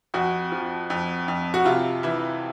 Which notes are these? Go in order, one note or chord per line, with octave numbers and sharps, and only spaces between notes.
F2 F#4
F3
F2
F2
F#4
C3 F4
E3 E4